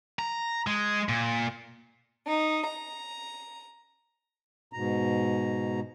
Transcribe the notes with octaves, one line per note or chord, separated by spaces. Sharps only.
A#5
G#3
A#2
D#4
A#5
G#2 B2 A#5